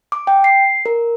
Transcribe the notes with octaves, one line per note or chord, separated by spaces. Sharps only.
D6
G5
C7
A#4